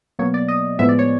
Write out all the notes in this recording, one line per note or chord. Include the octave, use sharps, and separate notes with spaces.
B2 F#3 A#3 C#5
D5
D#5
A2 F3 G#3 B3 E5
D5
C#5